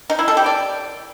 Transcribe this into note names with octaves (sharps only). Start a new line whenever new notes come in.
D#4
E4
A4
G4
D5